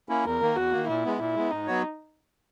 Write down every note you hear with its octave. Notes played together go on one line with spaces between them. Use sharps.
A#3 C#4 E4
E2 A#4
D#3 A#3
E2 F#4
D#3 A#3
A#2 E4
G#3 B3
A#2 E4
G#3 B3
G#2 D#4
F#3 B3 F#4 C#5